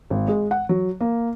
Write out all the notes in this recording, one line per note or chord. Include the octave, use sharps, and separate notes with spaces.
G#1
G#3
F#5
F#3
A#3